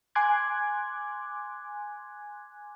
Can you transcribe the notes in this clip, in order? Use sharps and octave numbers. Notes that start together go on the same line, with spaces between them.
G#5 C6 D6 F#6 G#6